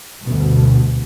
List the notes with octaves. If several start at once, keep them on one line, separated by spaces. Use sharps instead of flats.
D2 G2 B2